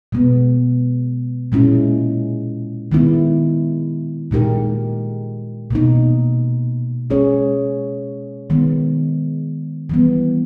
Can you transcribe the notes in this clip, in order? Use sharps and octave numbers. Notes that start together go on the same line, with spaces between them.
B2 G#3 B3
A#2 G#3 C#4 E4
D#3 G#3 B3 E4
A#2 G#3 D#4 G4 A#4
B2 A#3 D#4
G#3 C#4 G#4 C#5
D#3 G#3 B3
E3 G3 B3